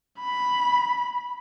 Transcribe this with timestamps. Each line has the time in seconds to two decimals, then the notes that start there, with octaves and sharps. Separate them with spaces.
0.19 B5